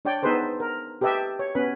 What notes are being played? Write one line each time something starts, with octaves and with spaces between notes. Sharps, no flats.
D4 C#5 D5 G5
B3 D#4 G#4 A4 B4 C5
A#4
G4 A4 B4 D#5 E5 G5
C#5
B3 C#4 B4 B5